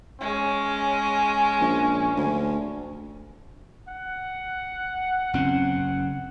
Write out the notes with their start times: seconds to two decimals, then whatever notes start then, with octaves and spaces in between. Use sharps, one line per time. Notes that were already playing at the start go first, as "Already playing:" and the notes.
0.21 G#3 C#4
1.60 A#1
2.16 D2
3.88 F#5
5.33 F#1 C4 C#4